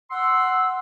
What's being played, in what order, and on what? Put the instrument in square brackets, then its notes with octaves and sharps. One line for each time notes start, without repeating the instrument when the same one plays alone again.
[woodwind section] F#5 C6 E6